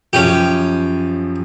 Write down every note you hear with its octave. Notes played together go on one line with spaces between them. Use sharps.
F#2 F3 C#4 G4